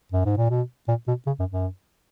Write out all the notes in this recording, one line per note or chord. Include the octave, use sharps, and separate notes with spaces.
F#2
G#2
A#2
B2
A#2
B2
C#3
F#2
F#2